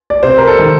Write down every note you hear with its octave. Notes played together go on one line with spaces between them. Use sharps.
D5
C3 C5
A#4
A4
D#3